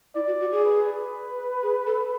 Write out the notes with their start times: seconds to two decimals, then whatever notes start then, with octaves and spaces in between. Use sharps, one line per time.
0.15 E4 D5
0.27 F#4
0.40 F#4
0.52 G#4
0.65 B4
1.63 G#4
1.87 A4